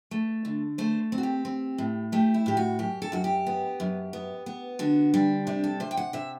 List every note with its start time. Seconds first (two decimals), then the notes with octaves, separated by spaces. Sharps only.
0.11 A3
0.45 D3
0.78 A3 C5
1.12 C4
1.18 F#4
1.23 G4
1.45 C4
1.78 A2
2.12 A3 G4
2.34 E4
2.46 A2 G4
2.57 F#4
2.79 F#2 G4
3.02 A4
3.12 F#2 F#4
3.24 G4
3.47 B3
3.80 F#2
4.13 B3
4.46 B3
4.79 D3 F#4
5.14 G3 D4
5.47 C3 D4
5.64 A4
5.80 C3 C5
5.91 G5
5.97 F#5
6.13 C3 E5